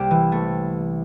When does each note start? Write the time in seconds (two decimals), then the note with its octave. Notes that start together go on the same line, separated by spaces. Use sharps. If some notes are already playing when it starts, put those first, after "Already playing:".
Already playing: C2 G3 A#3 G4
0.11 E3
0.32 A3